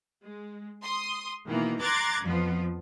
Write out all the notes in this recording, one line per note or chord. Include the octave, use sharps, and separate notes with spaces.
G#3
C6 D#6
B2 D#3 E3 A#3
A#5 C6 D6 F#6 G#6 A6
F2 F3 B3